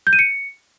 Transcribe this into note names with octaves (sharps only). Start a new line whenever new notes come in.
G6
D#7
C#7